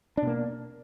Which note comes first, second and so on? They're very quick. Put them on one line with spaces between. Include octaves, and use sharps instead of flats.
D4 B2 A#3